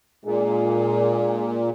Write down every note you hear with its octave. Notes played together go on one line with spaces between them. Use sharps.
A#2 G#3 D4 G#4